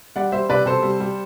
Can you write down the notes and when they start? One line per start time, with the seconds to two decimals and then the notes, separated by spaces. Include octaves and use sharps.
0.16 G3 D5 F#5
0.32 G3 C5 E5
0.49 C3 B4 D5
0.66 C3 A4 C5
0.83 G3
1.00 G3